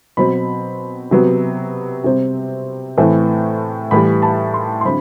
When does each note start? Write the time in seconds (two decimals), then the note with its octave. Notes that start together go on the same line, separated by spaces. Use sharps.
0.17 B2 F#3 C4 B5
1.11 C3 F#3 B3
2.04 C3 G3 C4
2.98 A2 E3 A3 C4
3.91 A2 E3 G3 B5
4.22 A5
4.54 C6
4.81 C6
4.85 D3 F#3 C4 B5